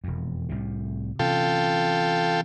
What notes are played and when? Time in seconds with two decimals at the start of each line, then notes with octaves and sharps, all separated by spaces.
0.04 E1 F2
0.49 C2 A2 C3
1.19 C3 E3 C#4 F4 A4 G5